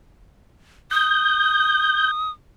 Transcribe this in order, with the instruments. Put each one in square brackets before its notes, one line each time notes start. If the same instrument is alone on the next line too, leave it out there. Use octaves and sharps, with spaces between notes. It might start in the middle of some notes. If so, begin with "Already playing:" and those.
[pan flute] D#6 [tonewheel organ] G6